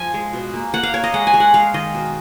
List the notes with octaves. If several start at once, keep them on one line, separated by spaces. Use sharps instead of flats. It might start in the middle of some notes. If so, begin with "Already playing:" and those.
Already playing: F3 G#5
G#3
B2
A#3
A#3 F#5
F5
A#3 C#5
D#5
G#3 F#5
G#5
G#3
F#5
G#3 F5
D#3 D#5
B2